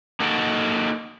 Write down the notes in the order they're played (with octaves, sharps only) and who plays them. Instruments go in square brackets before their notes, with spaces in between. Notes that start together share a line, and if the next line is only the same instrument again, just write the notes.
[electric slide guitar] A#3 D#4 F#4 A4 A#4